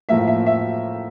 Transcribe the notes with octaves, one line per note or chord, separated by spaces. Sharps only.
A2 F3 A#3 E5
E5
E5